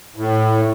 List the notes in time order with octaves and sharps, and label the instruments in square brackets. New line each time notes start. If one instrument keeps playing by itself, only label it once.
[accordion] A2